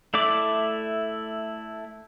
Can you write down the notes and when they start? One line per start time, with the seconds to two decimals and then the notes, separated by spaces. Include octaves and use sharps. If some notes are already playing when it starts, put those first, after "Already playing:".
0.14 A3 E4 D5 E5 D6